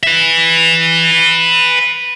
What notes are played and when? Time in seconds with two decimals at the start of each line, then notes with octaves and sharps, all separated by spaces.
0.03 B4 E5